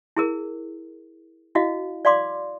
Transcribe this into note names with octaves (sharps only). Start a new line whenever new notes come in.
E4 G#4 A#4
E4 F#4 D#5 F5
D5 F5 C6 D6